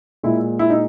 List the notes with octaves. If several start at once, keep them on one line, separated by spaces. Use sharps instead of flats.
A#2 G#3 E4
E4
D#4